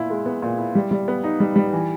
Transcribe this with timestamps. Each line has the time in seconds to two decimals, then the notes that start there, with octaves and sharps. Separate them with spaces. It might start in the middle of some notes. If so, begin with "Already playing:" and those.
Already playing: A#2 E4
0.10 G#3
0.26 B3
0.42 A#2
0.58 E4
0.75 G3
0.91 G3
1.08 B3
1.24 D#4
1.40 G3
1.56 G3
1.73 E3